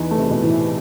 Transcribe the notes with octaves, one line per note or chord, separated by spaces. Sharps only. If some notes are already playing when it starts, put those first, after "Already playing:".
Already playing: E2 E3 D#4
A3
C3
B2
A2 E3